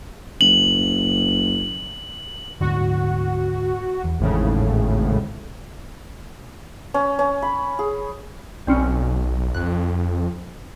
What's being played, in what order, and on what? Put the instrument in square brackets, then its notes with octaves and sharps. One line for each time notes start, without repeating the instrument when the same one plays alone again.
[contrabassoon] F#1 [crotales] F#7
[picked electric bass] D2 G#2 D3 [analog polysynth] F#4
[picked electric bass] E2
[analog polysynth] G#1 A2 C#3
[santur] C#4
C#4
B5
G#4
[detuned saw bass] B1 [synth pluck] G3 C4 C#4
[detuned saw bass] F2 [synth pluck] F#6